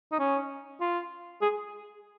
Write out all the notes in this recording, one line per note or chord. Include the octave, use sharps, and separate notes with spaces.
D#4
C#4
F4
G#4